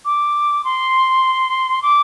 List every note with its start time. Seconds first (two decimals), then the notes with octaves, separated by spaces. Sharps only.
0.05 D6
0.65 C6
1.83 D6